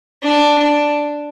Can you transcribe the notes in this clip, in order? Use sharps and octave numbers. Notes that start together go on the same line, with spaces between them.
D4
D4